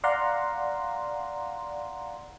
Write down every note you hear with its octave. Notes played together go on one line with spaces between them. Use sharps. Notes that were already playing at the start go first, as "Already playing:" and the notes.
D5 F5 F#5 A#5 C6